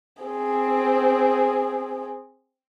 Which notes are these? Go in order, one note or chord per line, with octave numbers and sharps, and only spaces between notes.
C4 G#4